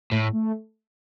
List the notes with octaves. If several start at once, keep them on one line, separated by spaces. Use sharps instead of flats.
A2 A3
A3